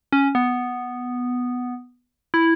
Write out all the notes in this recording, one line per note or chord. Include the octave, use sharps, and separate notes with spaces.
C#4
B3
E4